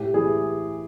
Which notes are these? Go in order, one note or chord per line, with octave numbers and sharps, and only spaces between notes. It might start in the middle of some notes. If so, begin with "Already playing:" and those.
Already playing: A2 G4
E3 G#4